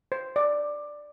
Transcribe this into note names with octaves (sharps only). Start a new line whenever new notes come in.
C5
D5